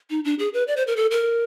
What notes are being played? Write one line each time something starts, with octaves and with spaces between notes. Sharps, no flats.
D#4
D4
G#4
B4
D5
C5
A#4
A4
A#4